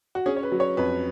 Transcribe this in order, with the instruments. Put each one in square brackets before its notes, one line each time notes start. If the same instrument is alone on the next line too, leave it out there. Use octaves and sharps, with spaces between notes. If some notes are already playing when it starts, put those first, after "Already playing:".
[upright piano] F#4
C#4 G#4
C#5
B4
F#3
C#5
F2 B4